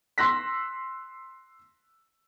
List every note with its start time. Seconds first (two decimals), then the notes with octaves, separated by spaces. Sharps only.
0.18 C6 E6 F#6 A#6 B6